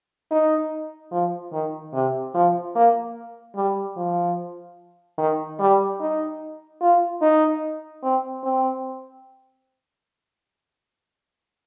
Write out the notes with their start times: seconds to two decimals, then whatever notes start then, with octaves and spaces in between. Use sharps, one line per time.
0.31 D#4
1.12 F3
1.52 D#3
1.93 C3
2.34 F3
2.75 A#3
3.55 G3
3.96 F3
5.18 D#3
5.59 G3
6.00 D#4
6.81 F4
7.21 D#4
8.03 C4
8.43 C4